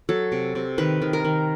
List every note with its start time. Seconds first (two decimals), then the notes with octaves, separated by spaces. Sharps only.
0.09 F#3 A4
0.32 C3
0.55 C3
0.78 D#3 B4
1.02 D#3
1.13 A#4
1.25 D#3